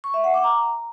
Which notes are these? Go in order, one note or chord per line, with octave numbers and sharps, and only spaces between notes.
C#6
E5
F#5
D6
A#5